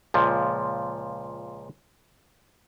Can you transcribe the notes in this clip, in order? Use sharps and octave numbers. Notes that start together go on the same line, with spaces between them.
C#2 A#2 F3